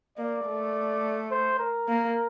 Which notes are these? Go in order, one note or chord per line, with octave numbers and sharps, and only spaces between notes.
A#3 D5
A3
C5
A#4
A#3